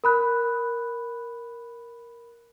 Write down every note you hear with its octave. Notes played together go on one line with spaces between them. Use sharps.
A#4 B5 F#6